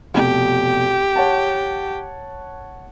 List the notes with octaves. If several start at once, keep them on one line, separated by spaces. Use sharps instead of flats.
F1 B2 G4
C#5 F#5 A5